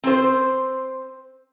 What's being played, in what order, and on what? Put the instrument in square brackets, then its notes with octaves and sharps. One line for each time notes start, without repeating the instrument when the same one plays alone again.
[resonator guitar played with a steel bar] C4 C5